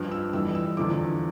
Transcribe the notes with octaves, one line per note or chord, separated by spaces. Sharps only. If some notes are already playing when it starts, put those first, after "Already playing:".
Already playing: G2 F3 F6
E6
F2 E3 G3 E6
E6
E2 D3 F3 D6